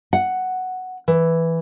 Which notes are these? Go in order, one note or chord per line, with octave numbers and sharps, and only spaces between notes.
F#5
E3